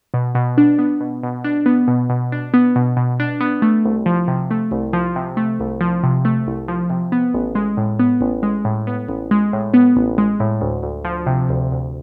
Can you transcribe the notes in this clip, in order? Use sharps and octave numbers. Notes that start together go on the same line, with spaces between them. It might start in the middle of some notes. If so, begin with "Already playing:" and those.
B2
B2
D4
B3
B2
B2
D4
B3
B2
B2
D4
B3
B2
B2
D4
B3
A3
C2
F3
C3
A3
C2
F3
C3
A3
C2
F3
C3
A3
C2
F3
C3
B3
A1
G#3
A2
B3
A1
G#3
A2
B3
A1
G#3
A2
B3
A1
G#3
A2
D2
D2
F3
C3
D2
D2